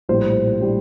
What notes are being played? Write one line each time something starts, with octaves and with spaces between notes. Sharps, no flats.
A#1 A2 G3 C5
A2 G3